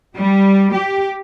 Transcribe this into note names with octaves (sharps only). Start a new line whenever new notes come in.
G3
G4